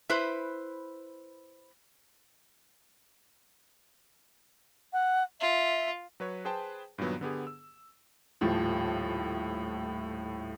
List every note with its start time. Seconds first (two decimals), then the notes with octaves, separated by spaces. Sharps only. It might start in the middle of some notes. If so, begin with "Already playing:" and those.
0.09 E4 B4 C5
4.93 F#5
5.40 F4 E5
6.20 F#3 B4 C#5
6.45 G#4 B4 C5 G5 A5
6.98 G2 A#2 D#3 F#3 B3
7.21 D3 B3 G4 G#4
7.47 E6
8.41 D#1 A2 F3